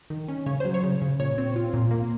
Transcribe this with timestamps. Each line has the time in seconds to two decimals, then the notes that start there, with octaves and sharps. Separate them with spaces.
0.10 D#3
0.28 C#4
0.46 C#3 C#5
0.60 F#3 C5
0.74 C#5
0.84 C#3
1.02 C#3
1.20 A#2 C#5
1.38 C4
1.56 F4
1.74 A#2
1.91 A#3